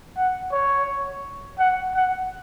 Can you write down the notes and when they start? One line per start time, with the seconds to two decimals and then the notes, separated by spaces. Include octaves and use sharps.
0.17 F#5
0.52 C#5
1.59 F#5
1.95 F#5